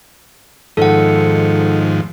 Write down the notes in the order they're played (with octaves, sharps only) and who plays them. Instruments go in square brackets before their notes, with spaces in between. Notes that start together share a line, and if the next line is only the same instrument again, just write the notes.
[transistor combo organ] G#2 D#3 F3 [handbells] A4 F#5